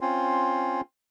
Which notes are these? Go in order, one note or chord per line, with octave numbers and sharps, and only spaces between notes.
C4 C#4 F4